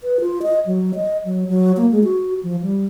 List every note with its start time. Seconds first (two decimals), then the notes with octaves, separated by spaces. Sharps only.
0.03 B4
0.21 F4
0.42 D#5
0.66 F#3
0.95 D#5
1.25 F#3
1.49 F#3
1.77 A#3
1.92 G#3
2.04 F#4
2.43 F3
2.62 G3